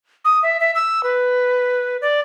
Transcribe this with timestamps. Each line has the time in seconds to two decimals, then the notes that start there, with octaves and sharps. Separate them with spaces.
0.25 D#6
0.43 E5
0.60 E5
0.75 E6
1.03 B4
2.01 D5